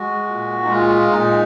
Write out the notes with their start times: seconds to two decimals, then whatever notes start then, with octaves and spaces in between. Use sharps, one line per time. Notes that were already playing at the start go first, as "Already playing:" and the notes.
Already playing: G#3 F#4
0.25 A#2
0.63 D#4
0.68 G#3 F4
1.12 A#2 D#4